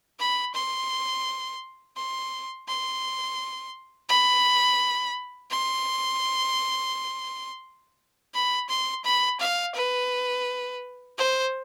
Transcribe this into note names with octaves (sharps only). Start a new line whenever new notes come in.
B5
C6
C6
C6
B5
C6
B5
C6
B5
F5
B4
C5